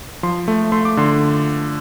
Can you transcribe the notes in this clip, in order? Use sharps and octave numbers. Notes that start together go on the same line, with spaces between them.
F3 C6
A3
A3 C6
D6
D3 C6